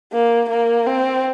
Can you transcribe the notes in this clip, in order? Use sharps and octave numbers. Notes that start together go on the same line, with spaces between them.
A#3
A#3
C4